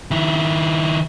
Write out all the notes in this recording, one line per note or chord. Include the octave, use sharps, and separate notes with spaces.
D#3 E4